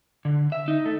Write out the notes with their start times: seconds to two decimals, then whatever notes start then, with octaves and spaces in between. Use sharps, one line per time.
0.25 D3
0.52 E5
0.68 D#4
0.86 A3